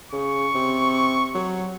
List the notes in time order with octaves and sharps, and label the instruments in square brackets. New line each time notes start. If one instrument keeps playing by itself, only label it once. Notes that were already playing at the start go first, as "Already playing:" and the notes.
[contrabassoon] C#3 [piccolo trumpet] C#6
[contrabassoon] C3
F#3